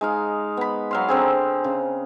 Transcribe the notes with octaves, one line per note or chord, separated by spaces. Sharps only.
G#3 D#4 F5
B3 B5
F#3 F5 C6
D3 C4 G#4
C#3